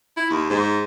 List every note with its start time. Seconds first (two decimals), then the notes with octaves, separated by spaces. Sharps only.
0.17 E4
0.30 D#2
0.49 G#2